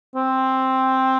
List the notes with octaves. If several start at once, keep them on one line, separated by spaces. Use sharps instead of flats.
C4